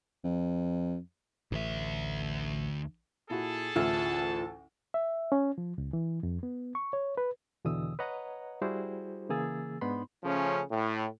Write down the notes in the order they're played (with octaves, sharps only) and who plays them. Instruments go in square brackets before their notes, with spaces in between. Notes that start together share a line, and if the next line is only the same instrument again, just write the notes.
[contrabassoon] F2
[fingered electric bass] A1 [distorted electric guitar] D2 E5
[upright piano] A#2 E4 F#4 [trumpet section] G#4 A4 A5
[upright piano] A1 D2 E6 [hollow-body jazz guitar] F4 E5
[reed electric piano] E5
C#4
F3
C#2
E3
F2
B3
C#6
C#5
B4
E2 B2 D3 E3 D#6 E6
B4 C#5 D#5 F#5 A#5
G3 E4 F#4 G#4 C5
C#3 E3 A#3 G#4 E6 A6
G#2 B3 D4 D#4 B5 C6
[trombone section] C#3 F3 A3 C#4
A2